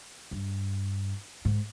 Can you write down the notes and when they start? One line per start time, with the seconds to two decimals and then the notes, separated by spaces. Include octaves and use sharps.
0.31 G2
1.45 G#2